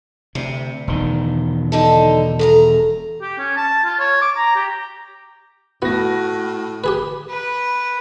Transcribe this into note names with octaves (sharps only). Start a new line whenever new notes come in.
D2 C3
E1 D#3
D3 D#4 A4
E2 G4 A4 A#5
G4
C#4
A5
F4
C#5
D6
A#5
G4
A2 B3 F#4 A#6
G4 G#4 B4
B4